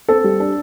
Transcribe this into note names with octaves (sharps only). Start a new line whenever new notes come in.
C4 A4
G3
D4